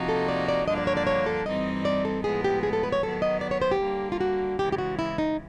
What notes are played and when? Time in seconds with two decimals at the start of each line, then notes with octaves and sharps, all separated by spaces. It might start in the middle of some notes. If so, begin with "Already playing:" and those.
Already playing: C3 F3 A#3 D#4 F#4
0.09 A4
0.28 D5
0.48 D5
0.67 G2 D3 F3 A#3 D4 D#5
0.78 D5
0.87 C#5
0.97 D5
1.07 C#5
1.26 A4
1.45 G2 E3 G3 C4 D#4 D#5
1.85 D5
2.05 A4
2.24 A2 F3 G#3 B3 G#4
2.44 G4
2.63 G#4
2.73 A4
2.83 B4
2.92 C#5
3.03 D#3 F#3 B3 A4
3.22 D#5
3.41 D5
3.51 C#5
3.62 C5
3.71 G4
3.81 D3 G3 A#3
4.12 F4
4.21 F#4
4.59 C#3 E3 G#3 G4
4.72 G4
4.78 F#4
4.99 E4
5.18 D#4